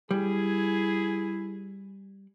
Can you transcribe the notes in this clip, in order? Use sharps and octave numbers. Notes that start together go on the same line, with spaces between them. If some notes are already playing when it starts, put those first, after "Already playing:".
G3 E4 G#4